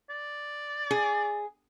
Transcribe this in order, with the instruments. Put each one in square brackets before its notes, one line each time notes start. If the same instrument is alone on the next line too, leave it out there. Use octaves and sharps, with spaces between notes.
[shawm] D5
[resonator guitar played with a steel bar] G#4